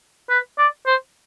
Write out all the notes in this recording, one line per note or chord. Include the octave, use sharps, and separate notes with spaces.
B4
D5
C5